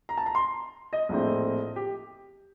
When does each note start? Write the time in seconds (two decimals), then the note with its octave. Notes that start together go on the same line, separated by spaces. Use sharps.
0.09 A#5
0.17 A5
0.26 A#5
0.35 C6
0.93 D#5
1.09 A#1 A2 A3 C4
1.76 G4